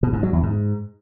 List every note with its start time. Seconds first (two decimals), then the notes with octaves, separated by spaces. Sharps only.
0.03 B2
0.13 G#2
0.23 F#3
0.33 E2
0.43 G#2